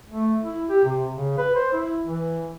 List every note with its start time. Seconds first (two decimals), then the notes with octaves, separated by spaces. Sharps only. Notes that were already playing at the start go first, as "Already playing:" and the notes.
0.11 A3
0.44 E4
0.70 G4
0.85 C3
1.14 C#3
1.38 B4
1.56 C5
1.73 E4
2.07 E3